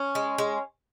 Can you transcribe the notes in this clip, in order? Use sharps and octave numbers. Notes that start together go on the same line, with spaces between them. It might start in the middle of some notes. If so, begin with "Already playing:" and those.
Already playing: C#4
G#3
G#3